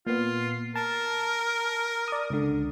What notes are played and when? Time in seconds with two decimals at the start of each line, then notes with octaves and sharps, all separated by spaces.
0.07 A#2 B3 F4
0.76 A#4 A5
2.08 D5 D#6
2.30 C#2 D3